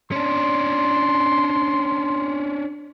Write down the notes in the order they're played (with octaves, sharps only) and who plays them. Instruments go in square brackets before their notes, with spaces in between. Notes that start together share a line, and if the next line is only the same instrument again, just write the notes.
[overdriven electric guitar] C#4 D4 [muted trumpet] C6